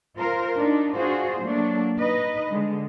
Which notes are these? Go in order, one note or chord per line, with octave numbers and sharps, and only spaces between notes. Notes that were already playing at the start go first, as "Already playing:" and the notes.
F4 A#4 C5
D4 D#4
D4 F4 F#4 G#4 C5
F#3 A3 A#3 D4
D#4 B4 D#5
D3 G#3